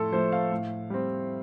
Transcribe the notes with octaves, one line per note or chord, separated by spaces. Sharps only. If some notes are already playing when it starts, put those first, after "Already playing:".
Already playing: A2 F3 A3 A4 C6
F3 A3 C5
F5
A2
G3 C4